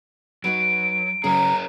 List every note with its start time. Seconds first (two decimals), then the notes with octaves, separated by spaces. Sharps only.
0.44 F#3 D#4 F#4 B4 D7
1.24 C#3 F#3 C#4 G#4 A#4 C#5 A#5